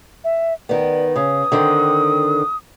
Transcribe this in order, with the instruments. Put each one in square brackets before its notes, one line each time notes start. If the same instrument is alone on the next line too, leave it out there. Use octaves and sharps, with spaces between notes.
[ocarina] E5
[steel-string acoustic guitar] D#3 B3 [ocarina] D5
[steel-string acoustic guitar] C#3 [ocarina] D#6
[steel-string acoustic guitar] D3 D#3 C4